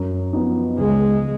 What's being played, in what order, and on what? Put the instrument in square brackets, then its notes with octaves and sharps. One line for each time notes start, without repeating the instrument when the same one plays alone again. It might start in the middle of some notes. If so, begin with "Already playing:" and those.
Already playing: [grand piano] F#2
F3 B3 D#4
[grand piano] C#2 [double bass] G#3